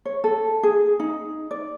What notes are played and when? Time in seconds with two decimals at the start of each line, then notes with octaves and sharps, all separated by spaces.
0.05 C#5
0.24 A4
0.63 G#4
1.00 D#4
1.51 D5